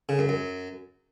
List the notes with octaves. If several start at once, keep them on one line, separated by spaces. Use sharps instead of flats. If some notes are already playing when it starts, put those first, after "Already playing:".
C#3
F#2
F#2